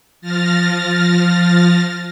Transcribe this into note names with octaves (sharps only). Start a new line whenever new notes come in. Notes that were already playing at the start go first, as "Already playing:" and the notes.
F3 F6 A6 A#6